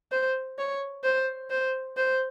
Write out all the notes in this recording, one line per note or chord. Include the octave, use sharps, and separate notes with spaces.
C5
C#5
C5
C5
C5